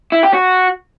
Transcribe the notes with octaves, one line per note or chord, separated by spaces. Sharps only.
E4
G4
F#4